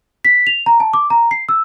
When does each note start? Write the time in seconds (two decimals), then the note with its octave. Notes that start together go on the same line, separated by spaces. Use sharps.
0.25 B6
0.47 F7
0.66 A#5
0.80 A5
0.94 D6
1.10 A#5
1.31 C7
1.49 E6